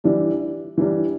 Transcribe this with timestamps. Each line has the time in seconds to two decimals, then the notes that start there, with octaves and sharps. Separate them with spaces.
0.04 E3 G3 D4
0.78 E3 G3 D4